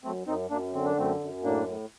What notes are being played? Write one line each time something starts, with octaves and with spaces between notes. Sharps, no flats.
F#2 A3 C4
F#2 C4 D#4
F#2 A#3 D4
D3 C4
D4
F#2 A3 C4
F#2
A2 A#3 D4
A2